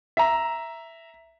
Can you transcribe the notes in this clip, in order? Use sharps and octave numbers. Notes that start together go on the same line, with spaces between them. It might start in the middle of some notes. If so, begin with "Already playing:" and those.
E5 A#5